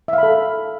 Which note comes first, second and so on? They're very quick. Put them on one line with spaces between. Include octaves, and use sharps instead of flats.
E5 F5 B5 A4